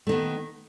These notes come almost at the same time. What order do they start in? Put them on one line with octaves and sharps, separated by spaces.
A3 D#3 B3